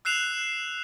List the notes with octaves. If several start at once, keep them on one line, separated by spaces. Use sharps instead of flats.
E6 F#6 C7 E7 F7